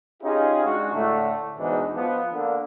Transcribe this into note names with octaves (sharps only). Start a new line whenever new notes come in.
C#4 D#4 F4 G4 G#4
G#3 D4 D#4 F#4
A2 D3 A3
E2 G#2 B2 E3 D4 D#4
F3 B3
D3 A#3